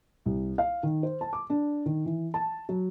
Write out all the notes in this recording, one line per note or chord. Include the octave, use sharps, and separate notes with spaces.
C2
F5
D#3
C5
A5
D6
D4
D#3
E3
A5
F#3